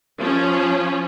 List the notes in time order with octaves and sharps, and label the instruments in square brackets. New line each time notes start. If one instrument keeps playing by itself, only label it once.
[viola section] F3 C#4